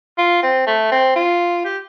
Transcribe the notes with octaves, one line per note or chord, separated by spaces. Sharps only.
F4
C4
A3
C4
F4
G4